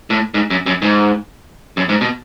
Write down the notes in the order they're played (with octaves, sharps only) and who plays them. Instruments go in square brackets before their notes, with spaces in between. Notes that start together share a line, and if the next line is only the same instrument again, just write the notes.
[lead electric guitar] A2
G#2
F#2
F#2
G#2
F#2
G#2
B2